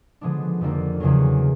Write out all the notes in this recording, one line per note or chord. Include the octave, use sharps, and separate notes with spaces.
D3 F3 G#3 B3 D4
F2 D3 F3 A#3 D4
E2 C#3 F#3